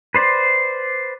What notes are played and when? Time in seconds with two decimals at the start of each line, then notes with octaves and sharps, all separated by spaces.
0.15 B4 C5 D5